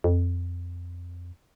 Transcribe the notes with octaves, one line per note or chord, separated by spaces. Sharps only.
F2